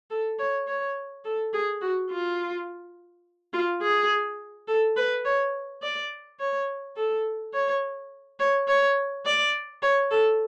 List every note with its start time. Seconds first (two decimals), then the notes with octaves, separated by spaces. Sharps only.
0.10 A4
0.39 C#5
0.67 C#5
1.25 A4
1.53 G#4
1.81 F#4
2.10 F4
3.53 F4
3.82 G#4
4.68 A4
4.97 B4
5.25 C#5
5.82 D5
6.39 C#5
6.96 A4
7.54 C#5
8.39 C#5
8.68 C#5
9.25 D5
9.82 C#5
10.11 A4